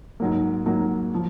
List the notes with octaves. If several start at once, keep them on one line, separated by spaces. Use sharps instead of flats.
G#2 F#3 A#3
G#2 F#3 A#3
F3